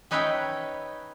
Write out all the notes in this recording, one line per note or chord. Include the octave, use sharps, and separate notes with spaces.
C#4 D#4 B4 C#5 E5 G5